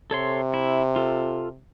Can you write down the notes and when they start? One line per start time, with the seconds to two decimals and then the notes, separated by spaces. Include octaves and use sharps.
0.11 C3 A4 C#5 C6
0.54 E4
0.96 F4 A4